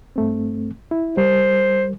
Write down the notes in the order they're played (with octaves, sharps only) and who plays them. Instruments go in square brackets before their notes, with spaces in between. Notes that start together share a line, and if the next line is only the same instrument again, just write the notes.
[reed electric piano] G2 A3 C4
E4
[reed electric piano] G3 A#4 [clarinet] C5